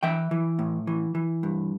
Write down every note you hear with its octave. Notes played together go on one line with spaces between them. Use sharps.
E3 E5 G5
E3
A2
E3
E3
G2